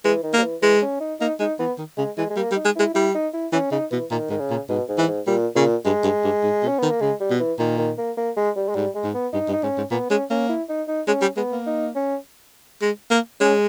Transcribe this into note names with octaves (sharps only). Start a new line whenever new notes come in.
E3 G#3
D#3
A#3
G3
E3
E3 G#3
C#4
D#4
A#3 D#4
G#3 D#4
E3 B3
D#3
C#3 G#3
E3 G#3
G#3
G3 A#3
G3
D#4
G#3
G#3 E4
G3 E4
D#4
E4
E3 C#4
C#3 D#4
B2 E3
A#2 D#3
G#2 D#3
C#3
A#2
G#2 B2
G#2
E3
G#2
A#2 G3
A#2 C#3
G2 G#3
G2
G2
G#2
B2
C#4
D#3 B3
A#3
C#3 G#3
G3
B2
E3
A#2 D#3
D#3
A#3
A#3
G#3
G3
G#3
G#2 G3
G#3
G#2
B3
G2 D#4
G2
D#4
G#2 C#4
G#2
A#2 B3
G#3 C#4
A#3 C#4
E4
D#4
D#4
G#3 C#4
G3
G#3 B3
A#3
D#4
C#4
G#3
A#3
G#3 C#4